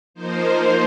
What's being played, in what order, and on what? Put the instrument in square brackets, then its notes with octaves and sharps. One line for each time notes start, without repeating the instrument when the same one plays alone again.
[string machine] F3 A#3 D#4 C5